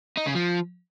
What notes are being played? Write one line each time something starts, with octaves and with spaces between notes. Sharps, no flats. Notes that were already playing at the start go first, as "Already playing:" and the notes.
D#4
C#3
F3